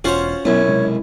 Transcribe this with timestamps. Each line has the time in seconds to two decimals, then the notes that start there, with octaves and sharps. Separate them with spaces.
0.04 E1 C#4 F4 F#4 C5 C#5 F5
0.45 B1 F#2 B3 C#4 E4 C#5
0.68 C3 G#3